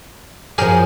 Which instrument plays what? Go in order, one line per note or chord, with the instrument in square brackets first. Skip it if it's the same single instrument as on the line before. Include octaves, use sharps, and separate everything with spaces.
[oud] F#2 F3 [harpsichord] G4 G#4 A#4